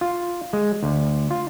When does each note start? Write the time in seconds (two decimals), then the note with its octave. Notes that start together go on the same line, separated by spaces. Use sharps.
0.01 F4
0.53 G#3
0.83 D2
1.31 F4